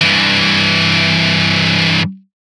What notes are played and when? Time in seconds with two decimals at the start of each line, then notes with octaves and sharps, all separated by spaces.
0.01 G2 E3